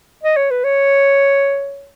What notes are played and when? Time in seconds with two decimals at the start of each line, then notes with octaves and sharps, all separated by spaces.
0.23 D#5
0.37 C#5
0.51 B4
0.64 C#5